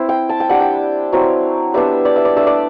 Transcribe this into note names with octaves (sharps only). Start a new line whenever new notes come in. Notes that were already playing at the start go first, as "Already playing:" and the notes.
Already playing: C4 E4
G5
A5
G5
G3 D4 F#5
G5
F#3 C4 E4
G3 B3 D4 E5
D5
E5
D5
A3 D4 E5
D5